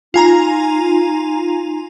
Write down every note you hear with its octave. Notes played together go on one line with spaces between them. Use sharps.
D#4 F4 G#5 A#5